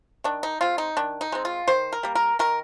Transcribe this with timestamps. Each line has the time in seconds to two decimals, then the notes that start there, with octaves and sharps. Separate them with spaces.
0.24 D#3 D4
0.43 D#4
0.61 G#3 C4 F4
0.78 D#4
0.97 D#3 D4
1.21 D#4
1.32 G#3 C4
1.45 F4
1.68 D#3 C5
1.93 A#4
2.03 G3 A#3
2.15 A#4
2.39 D#3 A#4